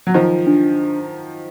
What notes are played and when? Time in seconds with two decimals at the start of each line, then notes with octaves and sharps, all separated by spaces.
0.07 F#3
0.14 D#3 F3 F4
0.47 D4